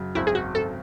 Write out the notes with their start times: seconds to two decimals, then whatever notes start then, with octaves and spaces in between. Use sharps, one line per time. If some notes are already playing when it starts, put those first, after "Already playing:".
Already playing: F#2 C#3
0.15 G#1 E4
0.27 G#4
0.35 F#4
0.55 G#1 A4